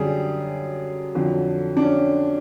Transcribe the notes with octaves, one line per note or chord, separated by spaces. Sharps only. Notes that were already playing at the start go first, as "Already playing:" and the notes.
Already playing: F#2 D3 G3 G#4
F2 D3 F#3
D4
C#4